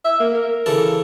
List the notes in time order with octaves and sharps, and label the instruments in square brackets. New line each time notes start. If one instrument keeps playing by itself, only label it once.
[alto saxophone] E5
A#3
A#4
[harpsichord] C#3 E3 A4